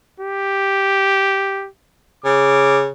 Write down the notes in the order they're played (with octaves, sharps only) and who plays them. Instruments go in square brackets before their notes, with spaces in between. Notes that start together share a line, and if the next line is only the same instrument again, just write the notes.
[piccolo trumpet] G4
[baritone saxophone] C#3 [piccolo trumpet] D6